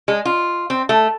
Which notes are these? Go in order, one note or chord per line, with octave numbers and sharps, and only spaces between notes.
G#3
F4
C4
A3